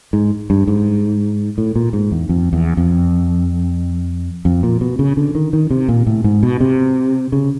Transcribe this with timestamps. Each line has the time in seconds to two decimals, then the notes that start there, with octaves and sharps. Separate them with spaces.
0.13 G#2
0.50 G2
0.67 G#2
1.58 A2
1.76 A#2
1.93 G#2
2.11 E2
2.29 F2
2.53 E2
2.77 F2
4.45 F2
4.63 A#2
4.81 B2
4.99 C#3
5.17 D3
5.35 D#3
5.53 D#3
5.70 C3
5.89 A#2
6.07 A2
6.24 G#2
6.43 B2
6.60 C3
7.32 C#3